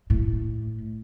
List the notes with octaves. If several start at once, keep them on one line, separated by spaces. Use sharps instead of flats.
A2